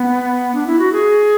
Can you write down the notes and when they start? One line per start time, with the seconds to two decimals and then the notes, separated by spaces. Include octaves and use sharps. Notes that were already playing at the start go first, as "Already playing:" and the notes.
Already playing: B3
0.55 D4
0.67 E4
0.79 F#4
0.93 G#4